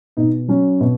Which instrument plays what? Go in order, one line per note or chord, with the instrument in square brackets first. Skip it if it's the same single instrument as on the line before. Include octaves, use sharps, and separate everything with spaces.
[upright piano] B2 D#4
F#3 C#4
B2